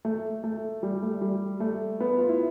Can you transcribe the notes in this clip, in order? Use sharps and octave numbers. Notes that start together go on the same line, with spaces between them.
A3
A3
G3
A3
G3
A3
B3
F4
E4